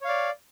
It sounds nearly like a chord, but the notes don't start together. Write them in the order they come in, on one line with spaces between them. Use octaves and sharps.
C#5 F5 D5